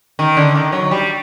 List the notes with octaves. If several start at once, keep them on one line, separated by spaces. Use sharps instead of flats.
D#3
D3
D#3
F#3
G3